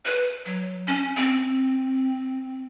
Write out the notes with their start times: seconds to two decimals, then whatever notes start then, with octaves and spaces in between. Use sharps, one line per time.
0.05 B4
0.46 F#3
0.88 C#4
1.17 C4